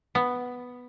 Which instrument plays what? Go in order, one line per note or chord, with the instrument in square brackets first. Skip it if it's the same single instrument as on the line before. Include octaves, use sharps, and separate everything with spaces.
[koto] B3